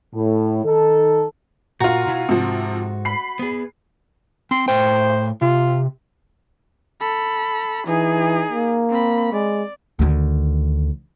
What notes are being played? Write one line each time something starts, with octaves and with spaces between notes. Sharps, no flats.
A2
D#3 D#4 A4
A#2 F4 F#4 A#5
B2 E4 G#5
G#2 C3 F3 A4
B5 C7
B3 G#4
C4 C6
A2 C5 G5
C3 F4
A4 B5
E3 D#4 G#4
A#3
C4 B5
G#3 D5
D2 D#3